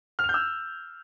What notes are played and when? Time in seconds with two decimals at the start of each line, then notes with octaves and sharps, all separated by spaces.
0.19 F6
0.24 F7
0.29 G6
0.34 E6